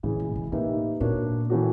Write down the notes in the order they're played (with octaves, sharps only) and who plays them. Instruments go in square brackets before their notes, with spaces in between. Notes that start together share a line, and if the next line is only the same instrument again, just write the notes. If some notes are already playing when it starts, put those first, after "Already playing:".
[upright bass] A2 [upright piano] C#3 E3 G#3
[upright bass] A#2
B2
[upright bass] A2 [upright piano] A#3 D#4 G4 B4 E5
[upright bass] A#2 [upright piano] B3 D4 F#4 A#4 C#5
[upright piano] A2 E3 A3 C#4 F#4